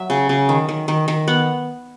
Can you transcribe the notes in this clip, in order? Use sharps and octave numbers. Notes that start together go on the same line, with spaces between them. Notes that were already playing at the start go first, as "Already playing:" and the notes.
Already playing: F#3 E5
C#3
C#3
D#3
D#3
D#3
D#3
B3 F#5